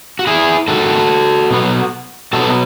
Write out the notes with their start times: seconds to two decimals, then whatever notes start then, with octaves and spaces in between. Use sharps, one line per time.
0.19 F#4
0.27 E4 G#4
0.68 G#2 D#3 A3 F#4 A4
1.51 B2 F#3 B3
2.33 B2 F#3 B3 F#4 A4